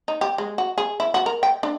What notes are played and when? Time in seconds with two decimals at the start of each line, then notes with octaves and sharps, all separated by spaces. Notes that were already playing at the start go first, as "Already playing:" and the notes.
0.08 D#4
0.21 G4
0.38 G#3
0.58 F#4
0.78 G#4
1.00 E4
1.14 F#4
1.26 A#4
1.43 G5
1.63 D4